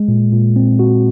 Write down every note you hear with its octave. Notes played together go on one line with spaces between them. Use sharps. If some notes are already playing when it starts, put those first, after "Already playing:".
Already playing: G#3
A#2
A#2
C4
F#4